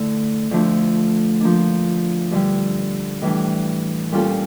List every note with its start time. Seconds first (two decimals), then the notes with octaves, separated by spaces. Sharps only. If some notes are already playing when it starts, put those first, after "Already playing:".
Already playing: D3 A3 E4 A4
0.51 D2 D3 F3 A3 D4
1.40 F3 A#3 D4
2.31 G2 D3 G3
3.21 A2 E3 G3 D4
4.12 A#2 G3 C#4 F4 A4